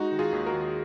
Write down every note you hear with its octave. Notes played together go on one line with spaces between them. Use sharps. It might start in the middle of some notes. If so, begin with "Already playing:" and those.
Already playing: G#3 D#4 F#4
D#3
F4 G#4
D#2
F#4 A#4
D#2